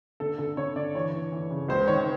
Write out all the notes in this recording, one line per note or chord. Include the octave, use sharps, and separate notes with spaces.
D3 A4
D3 A4
D3 C#5
D3 D5
E3 C#5
E3
E3
C#3
C#2 C5
D#3 C#5